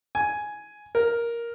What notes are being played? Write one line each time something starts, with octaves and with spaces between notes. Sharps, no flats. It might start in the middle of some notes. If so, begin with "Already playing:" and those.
G#5
A#4